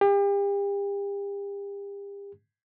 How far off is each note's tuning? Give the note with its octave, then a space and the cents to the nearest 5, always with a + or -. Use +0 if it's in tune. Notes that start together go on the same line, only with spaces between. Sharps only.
G4 +40